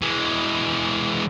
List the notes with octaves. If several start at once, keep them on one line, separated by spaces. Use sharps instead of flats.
E3 G#3